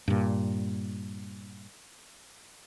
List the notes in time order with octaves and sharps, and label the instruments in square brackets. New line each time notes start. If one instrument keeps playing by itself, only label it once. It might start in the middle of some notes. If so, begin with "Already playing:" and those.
[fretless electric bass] G2 A#2